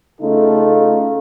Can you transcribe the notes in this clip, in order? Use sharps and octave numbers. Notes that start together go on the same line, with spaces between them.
C#3 A3 D#4 F4 A4